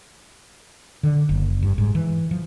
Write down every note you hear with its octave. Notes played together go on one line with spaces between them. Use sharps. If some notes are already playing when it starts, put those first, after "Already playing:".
D3
F#1
G2
G#2
E3
F3